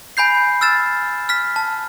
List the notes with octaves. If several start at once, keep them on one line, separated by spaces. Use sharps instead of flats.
G#5 B5 G6 C7
E6 F6 A6 E7
F6 B6
A5